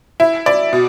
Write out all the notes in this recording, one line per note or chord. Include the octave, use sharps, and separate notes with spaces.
E4
D5
B2